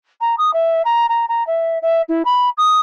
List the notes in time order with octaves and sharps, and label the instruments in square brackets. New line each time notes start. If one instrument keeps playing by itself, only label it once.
[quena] A#5
D#6
E5
A#5
A#5
A#5
E5
E5
E4
B5
D#6